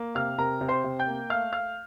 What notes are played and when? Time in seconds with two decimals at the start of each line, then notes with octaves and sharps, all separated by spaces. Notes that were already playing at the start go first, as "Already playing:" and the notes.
Already playing: A#3
0.15 C3 F5 F6
0.38 C3 A#4 A#5
0.61 C3
0.68 C5 C6
0.84 C3
0.99 G5 G6
1.07 A#3
1.30 A3 F5 F6
1.52 A3 F5 F6